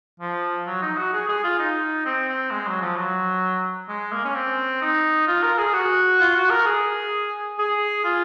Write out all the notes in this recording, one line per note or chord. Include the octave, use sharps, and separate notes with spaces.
F3
F#3
D#4
F#4
G#4
G#4
F4
D#4
C4
C4
G#3
F#3
F3
F#3
G#3
A#3
C#4
C4
D#4
F4
A#4
G#4
F#4
F4
F#4
A#4
G#4
G#4
F4